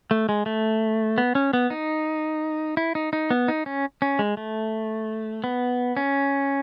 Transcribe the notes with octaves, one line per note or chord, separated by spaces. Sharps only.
A3
G#3
A3
B3
C#4
B3
D#4
E4
D#4
D#4
B3
D#4
C#4
C#4
G#3
A3
B3
C#4